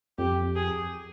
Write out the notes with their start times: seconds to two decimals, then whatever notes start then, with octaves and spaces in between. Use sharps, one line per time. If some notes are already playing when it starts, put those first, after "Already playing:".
0.18 F2 G4
0.56 G#4